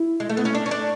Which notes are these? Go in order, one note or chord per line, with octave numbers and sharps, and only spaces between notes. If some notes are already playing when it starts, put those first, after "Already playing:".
Already playing: E4
G#3
A3
B3
C#4
D4
C#4
D4